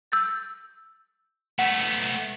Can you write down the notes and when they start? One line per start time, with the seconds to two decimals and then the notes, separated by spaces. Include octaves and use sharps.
0.12 E6 G6 A6
1.59 A3 B3 F#5 B6 E7